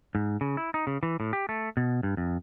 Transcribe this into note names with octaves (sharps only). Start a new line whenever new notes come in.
G#2
C#3
E4
D#4
C#3
E3
A2
G4
A3
B2
G2
F2